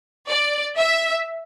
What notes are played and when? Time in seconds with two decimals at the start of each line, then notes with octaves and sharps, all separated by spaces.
0.28 D5
0.78 E5